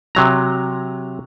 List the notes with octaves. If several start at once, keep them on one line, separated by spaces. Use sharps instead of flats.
C3 F#3 A#5